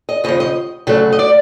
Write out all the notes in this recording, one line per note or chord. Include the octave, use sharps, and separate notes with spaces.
D#5
D#2 C#3 F3 D#5
D#5
D2 C#3 F#3 A3
D#5
D5